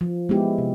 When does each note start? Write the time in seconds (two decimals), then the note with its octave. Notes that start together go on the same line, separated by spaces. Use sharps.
0.01 F3
0.29 G#3 B3 E4 G4
0.58 C3